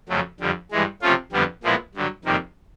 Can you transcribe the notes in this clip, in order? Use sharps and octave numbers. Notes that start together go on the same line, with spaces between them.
F2 C#3 F#3 A3
F2 D3 G3
G2 E3 G#3
C3 F3 A3 C#4 F4
F2 D3 G3 B3
A#2 F3 G#3 B3 E4
G2 D3 F#3
F2 C3 D#3 G3 A#3